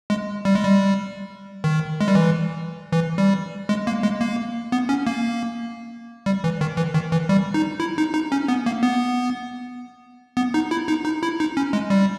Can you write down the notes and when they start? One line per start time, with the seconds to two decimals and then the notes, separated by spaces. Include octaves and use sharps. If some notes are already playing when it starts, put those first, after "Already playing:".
0.10 G#3
0.45 G3
0.55 G#3
0.64 G3
1.64 D#3
2.01 G#3
2.08 G3
2.15 E3
2.92 E3
3.18 G3
3.69 G#3
3.87 A#3
4.03 G#3
4.21 A#3
4.72 B3
4.89 C#4
5.07 A#3
6.26 G3
6.44 E3
6.61 D#3
6.77 E3
6.94 D#3
7.12 E3
7.29 G3
7.54 D#4
7.80 E4
7.98 D#4
8.14 D#4
8.32 C#4
8.48 B3
8.66 A#3
8.83 B3
10.37 B3
10.54 D#4
10.71 E4
10.88 D#4
11.05 D#4
11.23 E4
11.40 D#4
11.57 C#4
11.73 G#3
11.90 G3